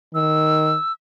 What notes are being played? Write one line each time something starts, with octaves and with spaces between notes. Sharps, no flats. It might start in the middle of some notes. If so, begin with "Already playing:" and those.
D#3 E6